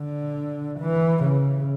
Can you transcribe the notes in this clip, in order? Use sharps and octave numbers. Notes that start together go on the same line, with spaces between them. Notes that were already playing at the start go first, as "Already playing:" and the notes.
Already playing: D3
E3
C#3